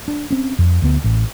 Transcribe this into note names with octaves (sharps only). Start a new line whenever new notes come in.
D4
C4 C#4
F2
D2 B3
A1